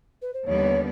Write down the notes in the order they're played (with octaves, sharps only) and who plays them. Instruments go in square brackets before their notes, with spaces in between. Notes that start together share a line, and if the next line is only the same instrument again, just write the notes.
[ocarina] B4
C5
[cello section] D#2 D3 G3 B3 [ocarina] C#5